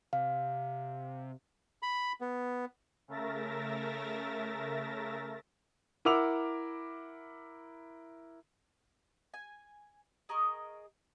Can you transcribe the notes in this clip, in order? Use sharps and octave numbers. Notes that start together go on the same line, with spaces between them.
C3 F5
B5
B3
C#3 A3 A#4 E5 A6 A#6
E4 A#4 F#5 D6 E6 F7
G#5
G#4 A#4 D#5 C#6